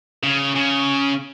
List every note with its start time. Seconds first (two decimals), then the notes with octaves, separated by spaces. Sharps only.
0.23 C#3
0.56 C#3